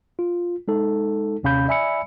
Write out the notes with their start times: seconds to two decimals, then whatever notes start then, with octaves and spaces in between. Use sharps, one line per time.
0.19 F4
0.68 G#3 D#4 A4
1.43 D#2 C3 C#4 F5 B5 G6
1.68 D5 E5 G#5 B5 E6 C#7